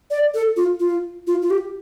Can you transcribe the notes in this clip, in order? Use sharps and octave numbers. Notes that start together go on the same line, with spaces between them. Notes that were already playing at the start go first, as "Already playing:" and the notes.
D5
A4
F4
F4
F4
F4
G4